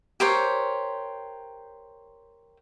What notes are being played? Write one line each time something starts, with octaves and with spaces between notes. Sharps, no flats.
G4 A#4 C5 C#5